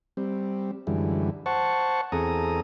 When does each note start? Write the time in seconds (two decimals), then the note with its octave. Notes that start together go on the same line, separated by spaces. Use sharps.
0.17 G3 C4
0.87 F#2 D3 E3 G3 G#3
1.46 C5 F#5 A5 C#6
2.12 E2 C4 G#4 A4 A#5 D#6